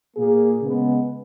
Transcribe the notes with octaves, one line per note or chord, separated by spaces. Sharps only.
A#2 A#3 G#4
C#3 G#3 B3